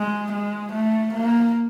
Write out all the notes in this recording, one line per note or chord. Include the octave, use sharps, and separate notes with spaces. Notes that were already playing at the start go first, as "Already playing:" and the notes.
Already playing: G#3
G#3
A3
A#3